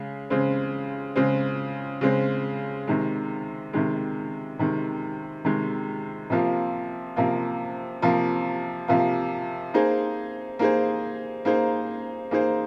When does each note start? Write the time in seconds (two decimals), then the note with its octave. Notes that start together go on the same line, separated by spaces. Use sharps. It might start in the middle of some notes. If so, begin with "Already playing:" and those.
Already playing: C#3 G#3
0.30 C#3 G#3 C4
1.16 C#3 G#3 C4
2.01 C#3 G#3 C4
2.87 C3 D#3 G#3
3.73 C3 D#3 G#3
4.59 C3 D#3 G#3
5.45 C3 D#3 G#3
6.30 C3 F3 A#3 F4
7.16 C3 F3 A#3 F4
8.02 C3 F3 A#3 F4
8.88 C3 F3 A#3 F4
9.74 A#3 D#4 G#4 C5
10.59 A#3 D#4 G#4 C5
11.45 A#3 D#4 G#4 C5
12.31 A#3 D#4 G#4 C5